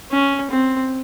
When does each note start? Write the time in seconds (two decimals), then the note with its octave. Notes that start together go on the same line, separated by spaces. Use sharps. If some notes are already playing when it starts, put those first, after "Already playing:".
0.11 C#4
0.51 C4